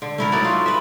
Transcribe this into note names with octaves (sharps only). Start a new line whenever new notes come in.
D3
A3 E4 A#4
F#3 D#4 D5
F4
B4 E5